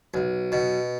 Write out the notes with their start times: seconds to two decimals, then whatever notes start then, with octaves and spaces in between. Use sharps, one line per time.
0.14 B1
0.52 B2